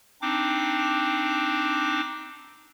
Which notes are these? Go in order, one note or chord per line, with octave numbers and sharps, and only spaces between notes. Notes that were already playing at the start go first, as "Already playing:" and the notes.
C4 D4 D#4 D6